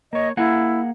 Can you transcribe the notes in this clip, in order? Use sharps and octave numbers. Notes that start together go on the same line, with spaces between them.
A#3 C#5 D#5
A#3 E4 G#4 F#5